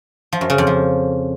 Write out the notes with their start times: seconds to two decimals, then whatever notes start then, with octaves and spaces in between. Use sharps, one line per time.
0.33 F3
0.41 F#2
0.50 C#3
0.58 F2
0.67 F3